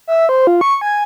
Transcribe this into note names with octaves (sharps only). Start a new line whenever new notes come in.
E5
C5
F4
C#6
G#5